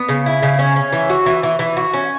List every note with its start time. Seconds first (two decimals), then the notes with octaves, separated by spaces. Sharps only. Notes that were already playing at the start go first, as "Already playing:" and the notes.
Already playing: B3
0.09 C#3
0.26 E4
0.43 C#3
0.59 C#4
0.76 C#4
0.93 E3
1.10 F#4
1.26 E3
1.43 E3
1.59 E3
1.77 F#4
1.93 C#4